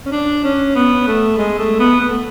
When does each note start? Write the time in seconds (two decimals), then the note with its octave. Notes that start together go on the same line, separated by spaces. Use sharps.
0.06 C#4
0.12 D4
0.44 C#4
0.75 B3
1.07 A3
1.38 G#3
1.59 A3
1.79 B3
2.01 B3
2.08 A3